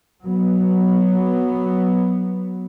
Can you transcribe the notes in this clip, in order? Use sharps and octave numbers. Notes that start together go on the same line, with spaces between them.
F#3 B3